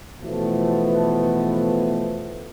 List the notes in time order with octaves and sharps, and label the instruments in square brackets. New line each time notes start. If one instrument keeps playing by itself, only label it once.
[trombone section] B2 E3 F3 A3 B3